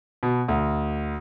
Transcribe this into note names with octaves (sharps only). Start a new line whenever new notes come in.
B2
D2